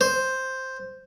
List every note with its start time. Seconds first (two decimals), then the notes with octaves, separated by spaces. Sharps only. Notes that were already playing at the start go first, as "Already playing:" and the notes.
0.01 C5